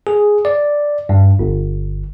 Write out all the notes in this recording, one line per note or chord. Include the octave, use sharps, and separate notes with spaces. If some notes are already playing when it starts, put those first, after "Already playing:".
G#4
D5
G2
G1